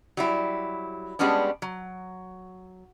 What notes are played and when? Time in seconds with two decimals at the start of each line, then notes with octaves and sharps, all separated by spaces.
0.17 F#3 G3 E4
1.19 G3 G#3 B3 C#4 D4
1.62 F#3